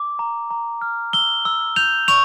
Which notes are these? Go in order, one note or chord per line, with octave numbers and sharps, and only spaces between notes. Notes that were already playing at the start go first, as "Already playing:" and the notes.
Already playing: D6
A#5
A#5
F6
E6 G7
E6
G6 F7
C#6 F7